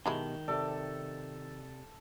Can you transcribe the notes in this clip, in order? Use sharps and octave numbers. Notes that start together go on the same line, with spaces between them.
B2 D#3 F#3 G#3 E4 G4 A5
C3 G4 A4 D5